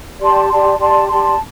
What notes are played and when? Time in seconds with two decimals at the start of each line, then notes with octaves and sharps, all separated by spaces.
0.19 G4 D5 A5 C6
0.49 G4 D5 A5 C6
0.79 G4 D5 A5 C6
1.09 G4 D5 A5 C6